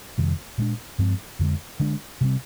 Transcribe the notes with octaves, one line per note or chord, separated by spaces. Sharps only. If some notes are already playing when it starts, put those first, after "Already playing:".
F2 C3 D#3 G3
A#2 G#3 D4
G2 F3 G#3 C4
F2 D3 G#3
D3 G#3 D4
C3 G3 C4